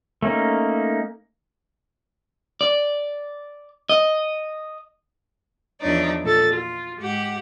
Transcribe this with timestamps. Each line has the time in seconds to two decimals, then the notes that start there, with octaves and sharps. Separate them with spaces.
0.22 A3 A#3 C#4 D#4
2.61 D5
3.89 D#5
5.80 E2 F3 D4 D#4 C#5 D5
6.24 A#2 A4 A6
6.54 F4
6.99 G#2 G4 F#5